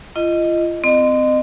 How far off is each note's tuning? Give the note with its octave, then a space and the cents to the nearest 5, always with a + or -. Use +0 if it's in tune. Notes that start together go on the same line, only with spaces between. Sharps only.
F4 -35 D#5 +0
C4 -25 D#5 -30